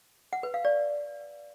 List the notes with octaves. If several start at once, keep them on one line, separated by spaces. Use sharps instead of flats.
F#5
B4
F5
D5